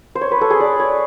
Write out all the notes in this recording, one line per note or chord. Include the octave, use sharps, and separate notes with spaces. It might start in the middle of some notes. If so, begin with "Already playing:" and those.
C5
C#5
B4
A4
G#4
D5
C#5